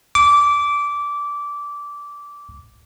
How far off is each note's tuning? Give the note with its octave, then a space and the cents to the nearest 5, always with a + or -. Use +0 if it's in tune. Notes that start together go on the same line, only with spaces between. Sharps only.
D6 -15